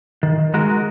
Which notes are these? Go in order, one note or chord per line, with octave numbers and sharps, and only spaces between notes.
D#3
G#3 F#4 A#4